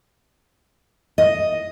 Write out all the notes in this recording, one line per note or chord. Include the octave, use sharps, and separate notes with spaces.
D#5